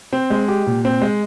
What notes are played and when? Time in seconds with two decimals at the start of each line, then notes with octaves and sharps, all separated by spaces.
0.12 C4
0.30 G#3
0.48 G4
0.66 A#2
0.85 C4
1.02 G#3